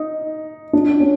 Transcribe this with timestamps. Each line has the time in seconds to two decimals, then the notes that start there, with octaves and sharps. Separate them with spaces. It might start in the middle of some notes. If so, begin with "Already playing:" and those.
Already playing: D#4
0.73 D4
1.00 C#4